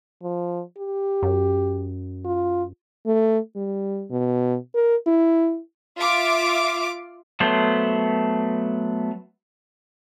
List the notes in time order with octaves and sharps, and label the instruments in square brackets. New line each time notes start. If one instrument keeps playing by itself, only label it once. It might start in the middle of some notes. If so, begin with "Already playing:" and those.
[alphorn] F3
G4
[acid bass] F#2
[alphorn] F4
[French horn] A3
G3
B2
A#4
E4
[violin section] F4 E5 F5 D6
[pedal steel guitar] F#3 A3 B3 C5